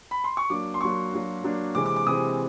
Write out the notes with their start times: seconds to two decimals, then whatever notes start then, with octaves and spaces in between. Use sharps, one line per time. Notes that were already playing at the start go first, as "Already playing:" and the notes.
0.11 B5
0.24 C6
0.37 C#6
0.50 F#3 A#3 D4 D6
0.74 C6
0.81 F#3 A#3 D4 C#6
1.12 F#3 A#3 D4
1.44 F#3 A#3 D4
1.75 C3 E3 G#3 C4 D6
1.86 D6
1.96 D6
2.06 C3 E3 G#3 C4 D#6